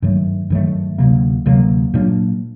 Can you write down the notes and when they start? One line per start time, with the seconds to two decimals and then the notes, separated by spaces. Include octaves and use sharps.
0.02 G2 D#3 F#3 A3
0.50 G2 D#3 F#3 A3
0.98 D2 C3 F#3 A#3
1.46 D2 C3 F#3 A#3
1.94 A#2 F#3 A#3 D4